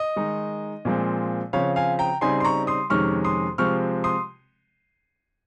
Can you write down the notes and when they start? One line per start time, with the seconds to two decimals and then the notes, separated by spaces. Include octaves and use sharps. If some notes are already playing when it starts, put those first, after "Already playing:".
Already playing: D#5
0.16 D#3 G#3 D#4
0.85 A#2 F3 G#3 C4
1.53 C#3 F3 C4 C#5 F5
1.76 F5 G#5
1.99 G5 A#5
2.21 C#3 G3 C4 D#4 G#5 C6
2.40 C6
2.45 A#5 C#6
2.67 C6 D#6
2.90 F2 C3 D#3 G#3 C#4 C#6 F6
3.25 C6 D#6
3.58 C3 F3 G#3 C4 C#6 F6
4.04 C6 D#6